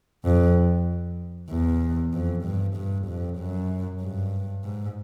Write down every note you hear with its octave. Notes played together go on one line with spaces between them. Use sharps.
F2
E2
F2
G2
G2
F2
F#2
G2
G#2